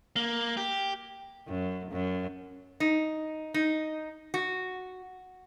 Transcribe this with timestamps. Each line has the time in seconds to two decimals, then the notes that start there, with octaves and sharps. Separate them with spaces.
0.16 A#3
0.57 G4
1.48 F#2
1.92 F#2
2.80 D#4
3.54 D#4
4.34 F#4